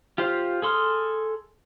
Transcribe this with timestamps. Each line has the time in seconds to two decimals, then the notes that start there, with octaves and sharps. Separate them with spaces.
0.18 F4 G4 C5 F5
0.62 G#4 A4 C6 D#6 F6